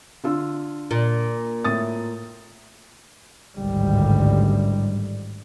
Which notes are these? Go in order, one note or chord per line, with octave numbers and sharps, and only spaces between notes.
D3 F4 E6
A#2
A2 D#6 A6
A1 D2 G#2 D3 D#3 G3